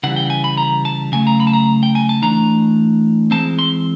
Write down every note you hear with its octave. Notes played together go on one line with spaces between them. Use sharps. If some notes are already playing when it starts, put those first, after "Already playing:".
C#3 E3 G3 F#5
G5
G#5
B5
A#5
A5
C#3 F#3 A3 G#5
A#5
B5
A5
A#5
G5
G#5
A5
E3 A3 D4 A#5
E3 G#3 C4 A5
C6